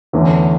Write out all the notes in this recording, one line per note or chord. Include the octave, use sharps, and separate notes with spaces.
E2 D3 A3 C#4